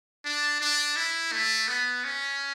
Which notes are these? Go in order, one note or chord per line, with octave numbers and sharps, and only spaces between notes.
D4
D4
E4
A3
B3
C#4